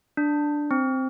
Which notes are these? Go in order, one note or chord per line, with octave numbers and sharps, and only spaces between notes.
D4
C4